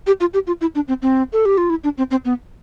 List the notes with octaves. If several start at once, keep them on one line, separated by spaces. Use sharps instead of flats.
G4
F4
G4
F4
E4
D4
C4
C4
A4
G4
F4
E4
D4
C4
C4
B3